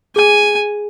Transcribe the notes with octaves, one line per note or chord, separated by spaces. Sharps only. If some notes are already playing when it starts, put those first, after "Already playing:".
G#4 G#5